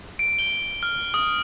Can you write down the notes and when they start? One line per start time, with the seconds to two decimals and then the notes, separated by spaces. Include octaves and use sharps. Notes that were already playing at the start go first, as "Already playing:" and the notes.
0.19 D7
0.39 G7
0.83 F6
1.14 D#6